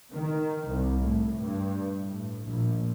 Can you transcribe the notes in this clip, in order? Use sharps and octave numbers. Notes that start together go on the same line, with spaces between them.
D#3
C2
A2
G2
A2
A#1